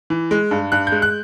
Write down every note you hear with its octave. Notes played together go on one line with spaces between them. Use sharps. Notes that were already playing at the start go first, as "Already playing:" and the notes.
E3
G#3
G2
G2 F#6
G6
G#3
F#6